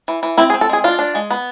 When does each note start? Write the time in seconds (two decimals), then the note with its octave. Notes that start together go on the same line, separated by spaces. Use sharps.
0.08 E3
0.23 E3
0.38 C4 E4
0.50 G#4
0.54 C4
0.61 A4
0.69 G#3 G#4
0.84 D4 F4
0.99 D4
1.15 G#3
1.31 B3